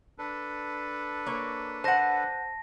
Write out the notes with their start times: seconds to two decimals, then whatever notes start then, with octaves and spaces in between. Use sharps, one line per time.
0.18 D4 A4 B4
1.26 A#3 C#5
1.84 C5 F#5 A5 A#6